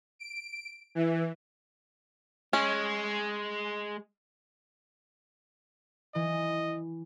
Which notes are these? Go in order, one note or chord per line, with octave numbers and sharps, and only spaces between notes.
D7
E3
G#3 C#4
E3 D#5